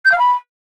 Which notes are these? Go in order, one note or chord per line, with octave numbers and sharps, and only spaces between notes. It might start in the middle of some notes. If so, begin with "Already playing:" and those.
G6
F5
B5